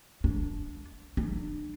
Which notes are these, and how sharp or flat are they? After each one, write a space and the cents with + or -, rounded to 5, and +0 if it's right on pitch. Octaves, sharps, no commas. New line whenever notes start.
D4 -15
D4 +35